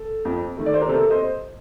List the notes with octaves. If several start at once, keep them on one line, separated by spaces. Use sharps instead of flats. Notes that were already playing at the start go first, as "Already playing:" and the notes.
Already playing: A4
F2
D#3 A3
D5
C5
A#4
C3 A4
C5 D#5